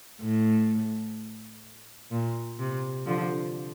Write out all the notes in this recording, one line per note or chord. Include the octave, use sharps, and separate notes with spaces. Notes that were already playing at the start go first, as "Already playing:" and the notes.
A2
A#2
C3
D3 F3